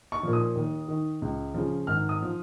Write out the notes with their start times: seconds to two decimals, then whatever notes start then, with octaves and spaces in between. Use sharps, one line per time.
0.12 C#6
0.23 A#2 F3
0.33 D#6
0.55 D#2
0.88 D#3
1.22 C#2
1.54 C#3 F3
1.87 G#1 F6
2.09 D#6
2.22 F3